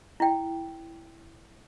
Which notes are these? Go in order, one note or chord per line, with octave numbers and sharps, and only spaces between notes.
E4 G5